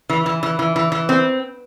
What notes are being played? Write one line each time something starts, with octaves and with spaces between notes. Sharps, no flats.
E3
E3
E3
E3
E3
E3
C4